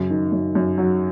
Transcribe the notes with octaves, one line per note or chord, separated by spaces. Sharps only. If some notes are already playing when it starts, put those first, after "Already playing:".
Already playing: F#2 C#3
D#3
F#2
F#2
F#3